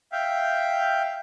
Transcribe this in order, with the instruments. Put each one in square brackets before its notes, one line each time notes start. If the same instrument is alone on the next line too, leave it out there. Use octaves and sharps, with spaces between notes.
[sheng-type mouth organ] E5 F5 G5